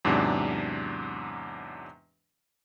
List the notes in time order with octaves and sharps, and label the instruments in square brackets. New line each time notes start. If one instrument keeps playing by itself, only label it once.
[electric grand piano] E2 G#2 C3 F#3 D4